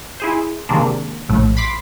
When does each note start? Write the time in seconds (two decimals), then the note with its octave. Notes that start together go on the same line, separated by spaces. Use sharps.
0.20 E4 G#4 C5
0.69 C3 D#3 G#3 A#3 D4
1.29 A#1 A2 A3
1.57 B5 C6 D6 B6